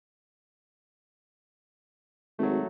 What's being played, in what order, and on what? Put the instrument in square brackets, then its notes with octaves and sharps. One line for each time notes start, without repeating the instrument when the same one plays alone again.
[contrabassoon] G#1 [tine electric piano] F#3 A3